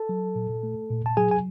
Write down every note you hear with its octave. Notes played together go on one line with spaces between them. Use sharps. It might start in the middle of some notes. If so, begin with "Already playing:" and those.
Already playing: A4 A5
F#3
A#2
A3
A#2
A5
F#3 G#4 G#5
G#5